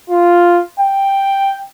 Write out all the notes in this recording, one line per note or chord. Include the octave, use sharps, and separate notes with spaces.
F4
G5